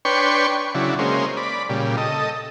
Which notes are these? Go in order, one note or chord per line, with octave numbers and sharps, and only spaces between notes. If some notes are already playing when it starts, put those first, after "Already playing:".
D4 B4 C#5 G5 C6 C#6
C#3 F#3 D4 E4
G#3 A#3 C#4 C5
D5 B5
A#2 C#3 G3
A4 D#5